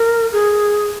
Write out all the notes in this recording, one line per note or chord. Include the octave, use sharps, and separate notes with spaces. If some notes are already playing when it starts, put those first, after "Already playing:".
Already playing: A#4
G#4